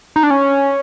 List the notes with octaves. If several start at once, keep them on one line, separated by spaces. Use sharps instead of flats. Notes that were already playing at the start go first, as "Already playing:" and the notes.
D#4
D4
C#4